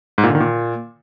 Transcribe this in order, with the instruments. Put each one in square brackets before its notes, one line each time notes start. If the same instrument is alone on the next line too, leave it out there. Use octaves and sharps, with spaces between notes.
[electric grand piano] G#2
A#2
D3
D#3
A#2